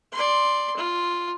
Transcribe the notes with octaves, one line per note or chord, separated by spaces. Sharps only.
D5 C6
F4